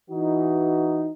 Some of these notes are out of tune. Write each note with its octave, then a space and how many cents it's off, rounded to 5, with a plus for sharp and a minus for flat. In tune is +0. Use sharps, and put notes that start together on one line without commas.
E3 +0 D#4 +0 F#4 +10